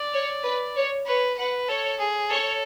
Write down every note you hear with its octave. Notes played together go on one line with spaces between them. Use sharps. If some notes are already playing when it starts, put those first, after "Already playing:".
Already playing: D5
C#5
B4
C#5
B4 C#5
B4 F#5
A4 C#5
G#4
A4 C#5